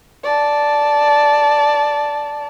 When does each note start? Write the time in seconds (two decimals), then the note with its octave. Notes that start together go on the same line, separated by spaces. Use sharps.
0.24 D5 A5